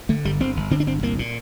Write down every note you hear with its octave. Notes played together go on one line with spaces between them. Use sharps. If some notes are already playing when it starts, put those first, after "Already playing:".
D3 A3
G1 G3
G1 C4
G1
D3 C4
D4
G1 C4
C2 A#3
A#2